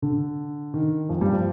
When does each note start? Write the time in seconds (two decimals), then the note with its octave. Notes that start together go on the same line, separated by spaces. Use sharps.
0.02 D3
0.74 D#3
1.09 F2 F3
1.21 G2 G3
1.33 F3